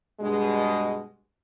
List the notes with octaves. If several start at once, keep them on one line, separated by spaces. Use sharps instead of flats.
G2 B2 G#3